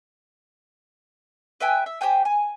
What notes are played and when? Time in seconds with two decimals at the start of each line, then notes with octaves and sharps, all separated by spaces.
1.60 B4 E5 G5 G#5
1.86 E5
2.01 G4 C5 G5 G#5
2.25 G#5